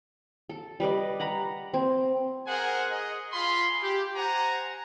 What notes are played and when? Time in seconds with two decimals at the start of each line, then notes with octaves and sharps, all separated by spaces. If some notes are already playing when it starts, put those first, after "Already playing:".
0.49 A4
0.80 G3 B4 D5 D#5
1.20 F#5 A#5 B5
1.74 C4
2.47 G#4 A#4 C5 F#5 G#5
2.91 G#4 D#5
3.32 F4 G#4 B5 C6
3.82 G4
4.16 C5 F#5 G#5 A#5